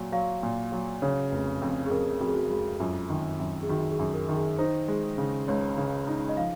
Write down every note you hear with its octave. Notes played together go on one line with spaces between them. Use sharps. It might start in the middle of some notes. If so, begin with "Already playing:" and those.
Already playing: A#2 F#3
F#3 F5
A#2
F#3
C#3 C#5
F1
F2
G#4
F2 A#4
F2 F#4
G#4
F#4
G#3 F#4
F#2 F4
D#3
F#2
G#4
D#3 F#4
G#4
F#2
A#4
D#3
G#4
D#4 C5
G#3
C#3
C#2 C#5
C#3
D#4
D#5
F3 F5